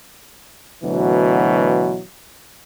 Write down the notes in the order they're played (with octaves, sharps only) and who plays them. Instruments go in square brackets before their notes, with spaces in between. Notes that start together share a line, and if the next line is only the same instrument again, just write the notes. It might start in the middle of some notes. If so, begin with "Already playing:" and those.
[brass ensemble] D2 B2 E3 F#3